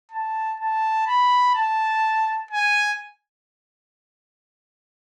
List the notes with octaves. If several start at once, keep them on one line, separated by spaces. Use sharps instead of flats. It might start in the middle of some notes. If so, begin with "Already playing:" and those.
A5
A5
B5
A5
G#5